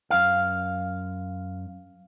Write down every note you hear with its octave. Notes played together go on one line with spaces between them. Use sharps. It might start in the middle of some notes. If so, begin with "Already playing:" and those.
F#2 F5